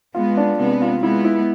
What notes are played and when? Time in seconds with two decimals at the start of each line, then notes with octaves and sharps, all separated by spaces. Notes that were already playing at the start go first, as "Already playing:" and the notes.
0.15 G#3 B3 F4
0.37 D4
0.59 C3 G#3 B3
0.82 F4
1.03 G#3 B3 E4
1.24 E4